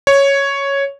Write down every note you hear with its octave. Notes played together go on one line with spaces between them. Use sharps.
C#5